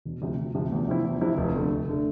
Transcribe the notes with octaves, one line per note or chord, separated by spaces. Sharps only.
E1
D2 C3 F3
E1
D2 C3 F3
E2
C3 F3 C4 E4
E2
C3 F3 C4 E4
F1
F2 D3 A3
F1
D3 A3